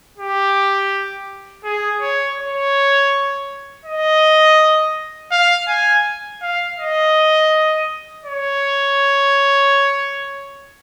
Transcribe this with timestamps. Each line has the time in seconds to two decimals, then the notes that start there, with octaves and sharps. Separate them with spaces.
0.18 G4
1.64 G#4
2.01 C#5
2.39 C#5
3.85 D#5
5.31 F5
5.68 G#5
6.42 F5
6.78 D#5
8.25 C#5